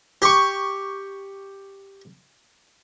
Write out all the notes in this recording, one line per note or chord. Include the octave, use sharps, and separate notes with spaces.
G4 C#6